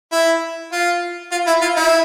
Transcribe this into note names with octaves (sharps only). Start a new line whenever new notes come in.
E4
F4
F4
E4
F4
E4